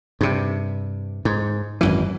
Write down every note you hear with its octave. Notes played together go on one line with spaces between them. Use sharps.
G2 C3
G#2
G#1 F#2 E3